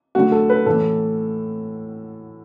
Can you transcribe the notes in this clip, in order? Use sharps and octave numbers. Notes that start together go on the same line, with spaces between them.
D3 F#3 A3 F#4
A4
B4
A2 E3 A3 A4